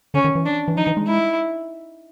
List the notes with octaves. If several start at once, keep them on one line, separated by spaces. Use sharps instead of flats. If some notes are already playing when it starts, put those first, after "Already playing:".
D3 C#4
D#3
E3
D4
E3
F3 D#4
E3
G#3
E4